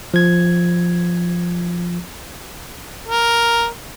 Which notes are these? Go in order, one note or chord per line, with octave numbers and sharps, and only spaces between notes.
F3 G#6
A#4